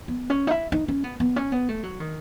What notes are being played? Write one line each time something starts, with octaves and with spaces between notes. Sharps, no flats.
B3
C#4
D#4
E4
D#4
C#4
B3
B3
C#4
B3
A3
F#3
D#3